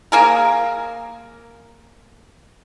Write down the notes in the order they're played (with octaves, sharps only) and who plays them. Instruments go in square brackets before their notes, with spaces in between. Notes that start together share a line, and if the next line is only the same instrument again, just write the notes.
[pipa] A#3 G#4 A#4